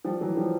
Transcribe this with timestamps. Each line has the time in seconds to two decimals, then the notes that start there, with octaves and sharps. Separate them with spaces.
0.05 F3 G3
0.21 E3 F#3
0.36 F3 G3